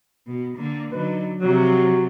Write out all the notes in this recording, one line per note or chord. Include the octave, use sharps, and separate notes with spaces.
B2
D3 A#3
D3 F#3 D#4 B4
C3 F3 F#3